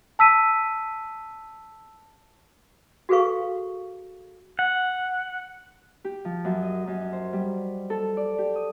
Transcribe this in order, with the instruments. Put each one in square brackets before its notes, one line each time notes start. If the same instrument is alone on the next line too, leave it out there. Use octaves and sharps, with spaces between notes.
[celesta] A5 E6 B6 D#7
[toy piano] F#4 G#4 A4 B4 F5 C#6
[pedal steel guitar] F#5
[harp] G4
F3
F#2
D#5
F#2
C5
G3
A4
D5
G4
D#6